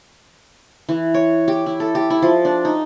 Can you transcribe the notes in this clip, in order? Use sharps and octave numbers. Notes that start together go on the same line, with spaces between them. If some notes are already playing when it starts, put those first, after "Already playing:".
E3
C#5
G4
E4
A4
G4
E4
F3
D4
D#4